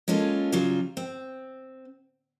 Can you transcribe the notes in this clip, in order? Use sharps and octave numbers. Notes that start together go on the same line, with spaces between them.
G#3 A#3 C#4 F4 A4
C#3 F#3 G3 F4
C4